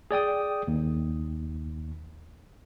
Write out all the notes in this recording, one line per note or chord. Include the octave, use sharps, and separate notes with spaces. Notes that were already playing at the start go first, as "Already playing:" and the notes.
G#4 D5 G5 D#6
D#2